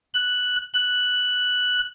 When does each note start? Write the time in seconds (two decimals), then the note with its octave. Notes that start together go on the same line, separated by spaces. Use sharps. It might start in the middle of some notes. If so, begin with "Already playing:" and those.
0.14 F#6
0.74 F#6